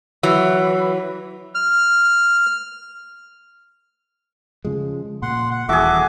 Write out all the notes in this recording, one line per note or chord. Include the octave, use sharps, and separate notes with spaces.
E3 F#3
F6
C#3 F3 G#3
A#2 F#5 C6
F#5
D#1 E3 F#4 G#4 A4 E5 D6